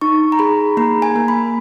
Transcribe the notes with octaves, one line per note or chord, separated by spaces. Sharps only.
D#4 C#6
A#5
G#4 B5
A#3 A#5
G#5
A#3
B5